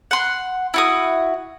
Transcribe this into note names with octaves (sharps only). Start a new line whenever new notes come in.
F#5 C6
E4 F#4 D#6